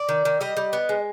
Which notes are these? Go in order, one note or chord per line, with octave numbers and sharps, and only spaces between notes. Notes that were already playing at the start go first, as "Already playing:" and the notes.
Already playing: D5
D#3
D#3
G3 D#5
G3
B3
G#3